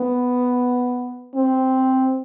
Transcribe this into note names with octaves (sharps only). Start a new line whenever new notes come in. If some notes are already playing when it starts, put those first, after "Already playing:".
Already playing: B3
C4